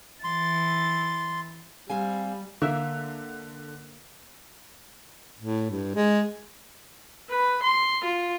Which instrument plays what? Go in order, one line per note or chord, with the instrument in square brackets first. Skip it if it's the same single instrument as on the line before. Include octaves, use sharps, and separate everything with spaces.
[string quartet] E3 A6 [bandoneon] C6
[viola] G3 [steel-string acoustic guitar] C4 F5 G#5
[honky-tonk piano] D3 [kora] A#3 E5
[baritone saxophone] A2
G2
G#3
[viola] B4
C6
F4